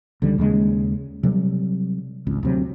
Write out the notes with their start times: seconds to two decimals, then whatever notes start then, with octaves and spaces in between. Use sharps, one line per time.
0.22 C#2 D3 G3
0.38 D#2 C#3 G#3
1.23 C3 F#3 G3
2.27 G#1 C#2
2.43 D2 C3 F#3